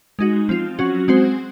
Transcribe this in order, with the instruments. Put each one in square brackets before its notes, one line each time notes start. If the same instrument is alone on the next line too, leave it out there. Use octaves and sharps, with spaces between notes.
[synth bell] G#3 D#4 F#4
F3 C4 F4
F#3 C#4 F#4
G#3 C4 F#4 C5